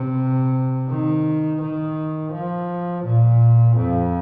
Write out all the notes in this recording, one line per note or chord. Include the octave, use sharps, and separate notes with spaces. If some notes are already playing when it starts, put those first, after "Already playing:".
Already playing: C3
D#3
D#3
F3
A#2
F2